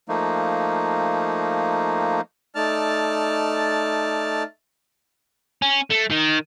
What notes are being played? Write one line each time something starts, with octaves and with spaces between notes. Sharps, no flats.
F3 A3 A#3 D#4
A3 D#4 D5 A5 F6
C#4
A3
D#3